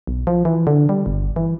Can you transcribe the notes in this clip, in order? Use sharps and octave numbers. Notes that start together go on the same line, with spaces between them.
B1
F3
E3
D3
G3
G1
E3